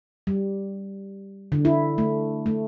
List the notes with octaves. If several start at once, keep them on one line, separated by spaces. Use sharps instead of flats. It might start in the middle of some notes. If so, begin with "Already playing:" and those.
G3
D3
E4
A3
A3